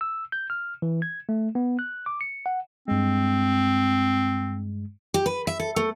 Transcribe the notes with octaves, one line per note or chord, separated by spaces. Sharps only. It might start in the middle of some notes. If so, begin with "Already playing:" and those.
E6
G6
F6
E3
G#6
A3
B3
F#6
D6
C#7
F#5
G2 G#3 C4
G4
B4
E5
A4
A3